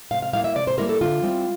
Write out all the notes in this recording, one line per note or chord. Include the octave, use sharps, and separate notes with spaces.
C3 F5
F5
G3 A#3 E4 F5
E5
C3 D5
C5
G3 A#3 E4 A#4
A4
D3 F4
G3 C4 E4